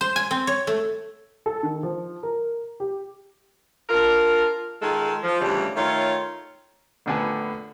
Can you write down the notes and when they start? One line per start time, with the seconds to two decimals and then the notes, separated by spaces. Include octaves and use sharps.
0.01 C5
0.16 G#5
0.31 C4
0.47 C#5
0.67 A3
1.46 A4
1.63 D#3
1.83 F3
2.23 A#4
2.80 G4
3.89 D4 F4 A#4
4.81 D#3 G#3 F4 G#4 A4
5.23 F3
5.40 D2 C#3 E3 G3
5.76 D#3 A3 F4 C#5
7.06 A#1 A2 D3 B3 G#5 A5